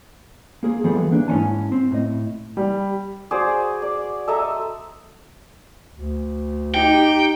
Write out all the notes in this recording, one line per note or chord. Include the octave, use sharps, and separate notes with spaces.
A#3 G#4
E3 F3 G3 B3 G#4 A4
E3 A#3 D4
G#2 C#4 E4 C#5 G#5 A5
C4
A2 D#5
G3
F#4 G#4 C5 D5
D5
A4 D#5 E5 A#5
D2
D#4 G4 G5